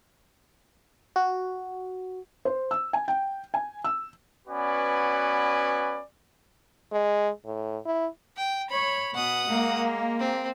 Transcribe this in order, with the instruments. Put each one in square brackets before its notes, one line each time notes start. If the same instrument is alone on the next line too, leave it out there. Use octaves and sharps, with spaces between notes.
[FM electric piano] F#4
[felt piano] C5
E6
G#5
G5
G#5
E6
[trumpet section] B3 C#4 F#4 B4 D5 G#5
[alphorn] G#3
A2
E4
[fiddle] G5
[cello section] C#5 [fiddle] B5
[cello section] B2 [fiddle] F#5 D#6
[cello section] G#3 A#3
[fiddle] C4